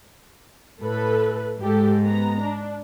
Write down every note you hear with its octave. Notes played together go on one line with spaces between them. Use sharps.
A2 A4 B4
G#2 G#3 G4 A4
B3 A#5
D4